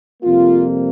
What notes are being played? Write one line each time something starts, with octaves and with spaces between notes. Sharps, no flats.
F2 C3 G3 A#3 F4